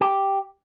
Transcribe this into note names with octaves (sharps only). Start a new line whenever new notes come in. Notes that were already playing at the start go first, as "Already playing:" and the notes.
G4